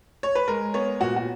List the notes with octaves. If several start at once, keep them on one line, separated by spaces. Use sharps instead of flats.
C#5
B4
G#3 A#4
B3 C#5
A#2 F#4
F#4